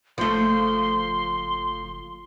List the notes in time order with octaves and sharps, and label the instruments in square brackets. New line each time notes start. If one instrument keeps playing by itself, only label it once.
[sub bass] F#1 [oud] F3 A3 [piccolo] C6